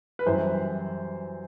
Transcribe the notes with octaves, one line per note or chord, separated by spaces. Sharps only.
B4
F#2 E3 G3 C5